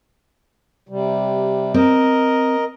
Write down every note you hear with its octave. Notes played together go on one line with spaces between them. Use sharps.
C3 G3
C4 A#4 D#5